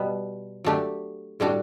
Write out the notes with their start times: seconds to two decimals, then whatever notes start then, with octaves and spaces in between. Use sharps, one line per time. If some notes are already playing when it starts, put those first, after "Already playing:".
Already playing: B2 G3 B3
0.64 F#3 A3 D4 G4
1.40 A2 G3 D4 F#4